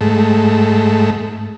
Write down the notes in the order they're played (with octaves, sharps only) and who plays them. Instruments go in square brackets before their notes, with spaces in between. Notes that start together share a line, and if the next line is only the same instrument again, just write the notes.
[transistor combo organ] G#2 A3